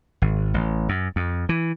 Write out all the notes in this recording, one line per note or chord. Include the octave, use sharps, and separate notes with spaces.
G#1
A1
F#2
F2
E3